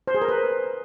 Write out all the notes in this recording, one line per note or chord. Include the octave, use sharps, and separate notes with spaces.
C5
G#4
A#4
B4